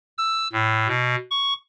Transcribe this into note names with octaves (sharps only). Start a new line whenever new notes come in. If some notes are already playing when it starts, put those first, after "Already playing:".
E6
A2
B2
C#6